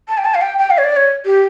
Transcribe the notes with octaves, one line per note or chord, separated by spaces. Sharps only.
A5
G5
A5
F5
G5
G5
F5
C#5
D5
C#5
G4